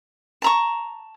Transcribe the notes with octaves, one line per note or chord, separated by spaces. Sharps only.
A5 A#5 C#6